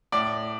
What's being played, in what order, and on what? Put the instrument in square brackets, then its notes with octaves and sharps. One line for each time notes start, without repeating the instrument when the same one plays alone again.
[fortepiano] A2 D5